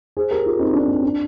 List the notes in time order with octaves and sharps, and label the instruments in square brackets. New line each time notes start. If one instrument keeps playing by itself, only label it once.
[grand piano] G#4 C5
G4 A#4
F4 G#4
C4 D#4
D4
C4
D4